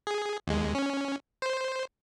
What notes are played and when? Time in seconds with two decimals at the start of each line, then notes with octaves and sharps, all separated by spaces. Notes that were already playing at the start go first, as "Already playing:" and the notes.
0.07 G#4
0.47 D#2 G#3
0.75 C#4
1.42 C5